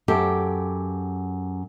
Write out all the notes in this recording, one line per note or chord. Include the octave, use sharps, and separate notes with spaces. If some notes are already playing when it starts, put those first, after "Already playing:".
F#2 G4 A4